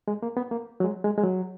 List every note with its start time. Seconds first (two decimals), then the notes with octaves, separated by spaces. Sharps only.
0.08 G#3
0.23 A#3
0.37 B3
0.51 A#3
0.80 F#3
0.84 G#3
1.04 G#3
1.18 G#3
1.24 F#3